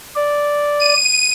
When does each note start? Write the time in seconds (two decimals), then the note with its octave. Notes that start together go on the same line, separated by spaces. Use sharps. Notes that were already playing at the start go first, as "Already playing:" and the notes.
0.16 D5
0.80 D#7